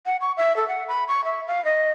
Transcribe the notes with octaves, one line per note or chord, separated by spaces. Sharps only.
F#5
C#6
E5
A4
F#5
B5
C#6
E5
F5
D#5